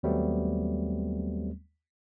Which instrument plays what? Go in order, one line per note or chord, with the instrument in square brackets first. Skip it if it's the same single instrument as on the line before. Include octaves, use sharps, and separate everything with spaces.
[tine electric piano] D#2 F#3 G3 A3 B3 C4